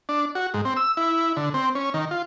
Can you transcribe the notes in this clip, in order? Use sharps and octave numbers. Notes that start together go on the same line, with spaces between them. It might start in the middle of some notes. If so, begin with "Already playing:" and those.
D4
F#4
G#2
C4
E6
E4
D3
C4
C#4
D#3
F4